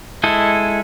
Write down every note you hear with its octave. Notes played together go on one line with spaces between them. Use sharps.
G#3 E4 A4 D#5